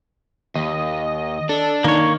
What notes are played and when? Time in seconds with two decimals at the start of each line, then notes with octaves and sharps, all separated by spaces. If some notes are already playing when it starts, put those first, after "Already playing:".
0.56 D#2 D#5
1.49 D4 A4
1.84 D#3 A#3 C#5